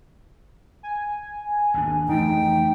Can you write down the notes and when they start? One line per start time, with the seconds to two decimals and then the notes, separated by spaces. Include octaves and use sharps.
0.83 G#5
1.74 G#1 D#2 D4
2.08 F2 E3 A3 D#4 G5